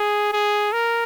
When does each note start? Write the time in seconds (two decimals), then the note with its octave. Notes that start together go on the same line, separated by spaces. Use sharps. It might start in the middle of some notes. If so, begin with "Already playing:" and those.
Already playing: G#4
0.32 G#4
0.72 A#4